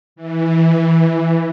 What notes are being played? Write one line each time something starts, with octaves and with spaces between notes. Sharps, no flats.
E3